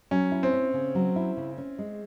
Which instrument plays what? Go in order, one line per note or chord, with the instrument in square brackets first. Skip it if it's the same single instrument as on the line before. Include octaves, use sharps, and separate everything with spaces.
[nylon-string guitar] F#3 [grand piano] C#4
[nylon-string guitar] E4
[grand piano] C4
[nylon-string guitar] C#4
C#3
F#3
E4
C#3
C#4
G#3